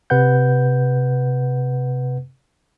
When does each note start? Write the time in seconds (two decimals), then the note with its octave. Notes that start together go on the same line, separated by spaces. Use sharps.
0.10 C3 B4 F#5 G6